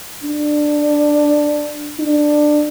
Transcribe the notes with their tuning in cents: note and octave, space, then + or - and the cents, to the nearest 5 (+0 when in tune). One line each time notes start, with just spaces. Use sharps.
D4 +10
D4 +15